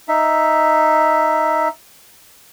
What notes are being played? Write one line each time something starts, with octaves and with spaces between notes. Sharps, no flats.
D#4 E5